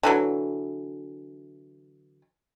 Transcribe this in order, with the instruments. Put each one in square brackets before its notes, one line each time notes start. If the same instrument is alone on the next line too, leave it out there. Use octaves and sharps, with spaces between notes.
[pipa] D3 E3 F#3